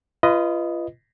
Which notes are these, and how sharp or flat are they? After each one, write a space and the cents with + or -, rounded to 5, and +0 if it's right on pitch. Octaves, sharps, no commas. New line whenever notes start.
F4 -30 B4 +0 D#5 +0